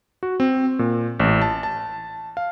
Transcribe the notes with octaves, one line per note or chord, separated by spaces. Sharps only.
F#4
C4
A#2
A1
A5
A5
F5